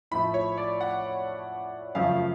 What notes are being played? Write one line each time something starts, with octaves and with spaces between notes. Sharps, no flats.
A2 F3 A3 B5
C#5
D5
F#5
F#2 C#3 F3 A3 F5